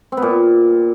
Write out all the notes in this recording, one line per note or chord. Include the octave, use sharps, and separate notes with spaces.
C4
B3
A#2